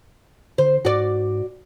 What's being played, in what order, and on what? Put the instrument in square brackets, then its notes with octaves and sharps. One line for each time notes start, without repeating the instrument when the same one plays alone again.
[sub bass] D3 [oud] C5
[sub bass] G#2 [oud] F#4 D5